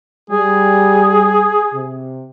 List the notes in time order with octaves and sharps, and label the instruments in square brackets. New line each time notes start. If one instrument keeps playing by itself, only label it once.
[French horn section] G3 [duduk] G#4
[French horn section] C3